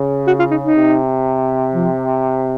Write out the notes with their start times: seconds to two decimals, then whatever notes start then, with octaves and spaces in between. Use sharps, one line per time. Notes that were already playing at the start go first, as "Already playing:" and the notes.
Already playing: C#3
0.27 F#4
0.39 F4
0.51 D#4
0.64 D#4
0.75 C3
1.73 F3